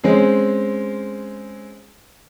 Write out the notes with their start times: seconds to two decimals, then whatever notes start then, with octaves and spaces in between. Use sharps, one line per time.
0.04 G#3 C4 C#4 G#4